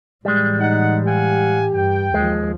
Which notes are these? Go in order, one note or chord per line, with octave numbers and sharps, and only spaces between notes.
A2 E3 G3 G#3
D#4 F#5
G4 F5 F#5 G#5
G2 G5
D#2 F3 G#3